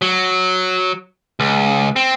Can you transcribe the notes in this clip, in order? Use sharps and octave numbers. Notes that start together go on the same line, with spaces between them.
F#3
C#2
C4